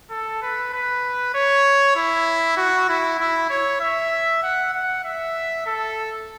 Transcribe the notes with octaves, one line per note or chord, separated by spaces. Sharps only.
A4
B4
B4
C#5
E4
F#4
E4
E4
C#5
E5
F#5
F#5
E5
A4